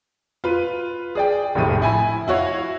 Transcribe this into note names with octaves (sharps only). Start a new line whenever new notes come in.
F4 B4 D#7
G#4 D5 G5
F1 A#1 A2 D#7
E4 G#5 B5
E4 F#4 C#5 F5